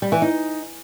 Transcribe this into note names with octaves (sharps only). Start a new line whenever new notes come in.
G3
E3
D#4